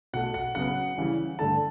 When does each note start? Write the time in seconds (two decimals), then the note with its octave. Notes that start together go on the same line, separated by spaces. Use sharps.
0.13 B2 A3 F#5
0.34 F#5
0.55 C#3 F#3 B3 F#5
0.97 C#3 E3 G3
1.39 G2 D3 A3 A5